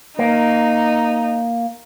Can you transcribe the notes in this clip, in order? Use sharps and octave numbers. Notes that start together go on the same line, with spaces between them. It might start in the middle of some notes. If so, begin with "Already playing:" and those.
A#3 D#4